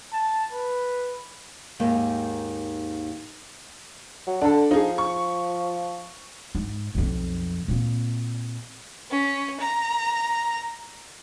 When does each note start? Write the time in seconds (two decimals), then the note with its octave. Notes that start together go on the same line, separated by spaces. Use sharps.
0.13 A5
0.53 B4
1.80 D#2 G#2 D#3
4.27 F#3
4.41 D3 D4 A4
4.71 F3 D#4 G#4
4.98 C#6
6.55 G#2
6.95 B1 F2
7.68 A#2 C4
9.10 C#4
9.59 A#5